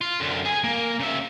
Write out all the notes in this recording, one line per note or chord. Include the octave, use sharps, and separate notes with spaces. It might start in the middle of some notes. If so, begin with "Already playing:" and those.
F4
F#2 D3
G#4 G#5
A#3
C#3 E5